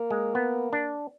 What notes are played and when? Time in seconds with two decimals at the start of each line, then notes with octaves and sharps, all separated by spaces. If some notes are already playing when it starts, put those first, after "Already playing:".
Already playing: A#3
0.11 G#3
0.35 B3
0.73 D4